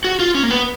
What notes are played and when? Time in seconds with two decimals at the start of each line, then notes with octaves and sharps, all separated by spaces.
0.04 F#4
0.19 F4
0.35 C#4
0.43 A#3
0.51 B3